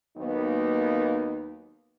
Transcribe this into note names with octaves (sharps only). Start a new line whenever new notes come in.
D#2 F#3 A#3 B3 D#4